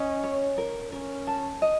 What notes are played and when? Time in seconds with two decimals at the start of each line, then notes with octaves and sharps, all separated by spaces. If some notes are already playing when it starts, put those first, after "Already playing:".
Already playing: C#4 D#5
0.24 C#5
0.58 A#4
0.92 C#4 A#4
1.27 A5
1.62 D#5